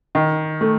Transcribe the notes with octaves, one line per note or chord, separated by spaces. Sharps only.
D#3
A3